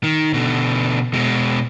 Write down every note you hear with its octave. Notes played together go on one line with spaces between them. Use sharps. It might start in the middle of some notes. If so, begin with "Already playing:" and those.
D#3
B2 D3
B2 G#3